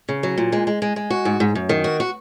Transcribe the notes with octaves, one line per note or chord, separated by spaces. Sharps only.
C#3
F#3
A#2
G#3
G#3
G#3
G#3
F#4
G#2
G#2
F#2
D#3
F#4
F#4